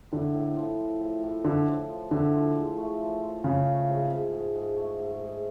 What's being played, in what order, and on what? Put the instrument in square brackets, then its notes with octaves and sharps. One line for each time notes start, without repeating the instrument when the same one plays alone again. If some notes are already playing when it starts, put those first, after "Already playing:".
[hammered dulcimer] A2 [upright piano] D3
[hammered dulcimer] A2
F3
F3
A2
A2
[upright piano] D3 [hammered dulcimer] F3
[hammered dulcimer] F3
F3
[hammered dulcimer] A2 [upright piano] D3
[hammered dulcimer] F3
G#3
A3
F3
F3
[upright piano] C#3 [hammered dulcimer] F3
[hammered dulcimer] A3
G#2
G#2
G#2
G#2
A3
G#2
G#2